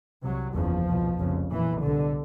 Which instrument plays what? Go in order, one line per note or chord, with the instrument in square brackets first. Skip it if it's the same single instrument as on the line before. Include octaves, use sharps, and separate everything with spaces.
[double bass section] C2 C3 F#3
F#1 E2 C#3 F3
C2 B2
F1 F2 C#3
B1 A#2 E3
C2 B2 D3